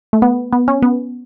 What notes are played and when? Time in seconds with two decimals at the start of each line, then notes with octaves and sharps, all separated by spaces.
0.13 A3
0.22 B3
0.53 B3
0.68 C#4
0.82 B3